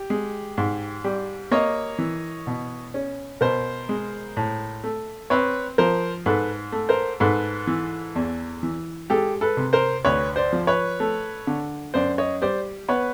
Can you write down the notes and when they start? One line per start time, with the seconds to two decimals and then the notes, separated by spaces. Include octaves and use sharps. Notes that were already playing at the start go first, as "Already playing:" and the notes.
Already playing: G4
0.10 G#3
0.58 G#2
1.04 G3
1.51 A#3 C#5 D#5
1.99 E3
2.47 B2
2.94 C#4
3.41 B2 A#4 C5
3.89 G#3
4.37 A2
4.84 A3
5.30 C4 B4 C#5
5.78 F3 A#4 C5
6.26 G#2 A4 B4
6.72 A3
6.89 A#4 C5
7.20 G#2 A4 B4
7.67 E3
8.15 E2
8.63 E3
9.10 G#3 G4 A4
9.41 A4 B4
9.57 C3
9.73 A#4 C5
10.05 D2 B4 C#5
10.36 C5 D5
10.53 F3
10.67 B4 C#5
11.00 A3
11.47 D3
11.94 F#2 C5 D5
12.18 C#5 D#5
12.42 G3 C5 D5
12.88 B3 B4 C#5